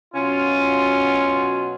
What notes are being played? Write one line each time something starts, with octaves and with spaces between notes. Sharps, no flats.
B2 F#3 C#4 F4